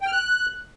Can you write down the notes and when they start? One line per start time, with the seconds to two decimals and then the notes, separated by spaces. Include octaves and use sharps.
0.01 G5
0.07 F6
0.12 F#6